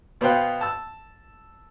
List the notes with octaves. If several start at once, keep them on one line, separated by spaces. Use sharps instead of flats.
B2 B3 C5 F5 G5 F#6
A5 E6